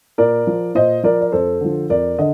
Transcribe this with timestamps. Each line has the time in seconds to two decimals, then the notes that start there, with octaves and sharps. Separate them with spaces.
0.18 A#2 A#4 D5
0.47 F3
0.75 A#2 C5 D#5
1.03 F3 A#4 D5
1.21 D5
1.32 F2 A4 C5
1.61 D3 F3
1.90 F2 A#4 D5
2.18 D3 D#5